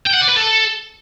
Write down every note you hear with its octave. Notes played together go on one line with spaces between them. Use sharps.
G5
F#5
D5
B4
A4